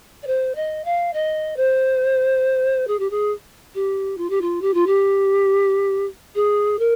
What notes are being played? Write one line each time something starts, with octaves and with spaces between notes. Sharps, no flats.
D5
C5
D#5
F5
D#5
C5
G#4
G4
G#4
G4
F4
G4
F4
G4
F4
G4
G#4
A#4